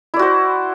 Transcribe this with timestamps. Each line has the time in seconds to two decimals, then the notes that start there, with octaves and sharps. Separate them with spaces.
0.14 E4
0.16 D5
0.19 F#4
0.22 C5